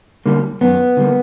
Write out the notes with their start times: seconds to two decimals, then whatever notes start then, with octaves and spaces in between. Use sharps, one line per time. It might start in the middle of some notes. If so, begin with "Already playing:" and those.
0.26 D3 G3 A#3
0.61 F#2 B3
0.97 D3 G3 A#3